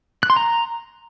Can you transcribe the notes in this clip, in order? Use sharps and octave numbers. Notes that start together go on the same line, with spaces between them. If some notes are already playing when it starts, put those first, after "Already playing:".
F#6
C6
A#5